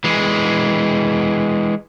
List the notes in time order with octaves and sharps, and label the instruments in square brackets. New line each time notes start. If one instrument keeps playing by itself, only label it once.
[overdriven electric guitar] E3 G#3